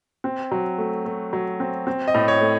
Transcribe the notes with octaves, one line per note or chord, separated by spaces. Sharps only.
C4
F#3
A3
A3
F#3
C4
C4
D#5
A2
C#5
A3